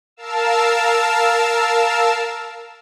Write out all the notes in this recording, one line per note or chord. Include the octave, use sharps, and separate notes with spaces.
A#4 F5 A5 E6